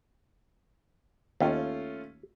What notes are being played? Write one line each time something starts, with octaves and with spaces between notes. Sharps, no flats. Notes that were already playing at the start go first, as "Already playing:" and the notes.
D#2 A3 C#4 F4